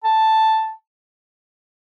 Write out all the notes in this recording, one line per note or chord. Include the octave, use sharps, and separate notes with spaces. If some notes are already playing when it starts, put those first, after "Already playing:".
A5